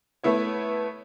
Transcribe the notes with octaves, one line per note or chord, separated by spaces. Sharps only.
A3 B3 E4 C#5